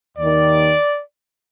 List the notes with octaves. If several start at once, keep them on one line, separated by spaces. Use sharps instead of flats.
D#2 D#3 D5